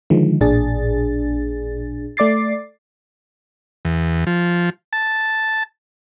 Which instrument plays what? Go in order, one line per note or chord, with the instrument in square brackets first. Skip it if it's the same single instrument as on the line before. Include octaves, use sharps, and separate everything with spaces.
[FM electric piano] D3 D#3 F3 G#3
A1 A#2 D4 G#4 A6
A3 D5 D6 A6 C7
[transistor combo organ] E2
F3
A5